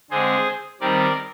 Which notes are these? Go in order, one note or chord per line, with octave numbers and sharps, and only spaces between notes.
D3 G#3 C4 G#4 C5
D#3 G3 C4 A#4 D5